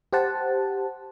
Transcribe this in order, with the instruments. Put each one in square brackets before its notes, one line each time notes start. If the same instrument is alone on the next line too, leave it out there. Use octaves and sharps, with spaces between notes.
[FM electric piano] G4 C5 F#5 A5